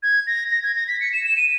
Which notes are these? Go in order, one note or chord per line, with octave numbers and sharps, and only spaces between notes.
G#6
A#6
A#6
G#6
A#6
B6
C#7
E7
E7
D#7